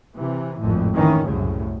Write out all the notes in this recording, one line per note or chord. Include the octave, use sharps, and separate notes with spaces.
C3 E3
G#1 F2 A2
D#3 E3 C#4
C2 F#2 A2 C#3